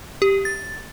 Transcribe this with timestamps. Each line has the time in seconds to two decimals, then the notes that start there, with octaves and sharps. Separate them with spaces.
0.22 G4
0.45 A6